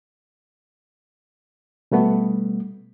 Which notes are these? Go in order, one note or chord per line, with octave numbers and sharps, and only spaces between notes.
B2 G3 A3 B3